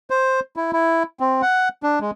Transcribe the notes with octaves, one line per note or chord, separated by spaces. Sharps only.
C5
E4
E4
C4
F#5
D4
G#3